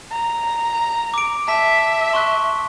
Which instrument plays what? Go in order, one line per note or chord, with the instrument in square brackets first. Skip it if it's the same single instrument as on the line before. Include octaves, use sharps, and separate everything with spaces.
[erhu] A#5
[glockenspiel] D6 D7
[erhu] E5 [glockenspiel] A5 B6
[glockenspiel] C6 C#6 F#6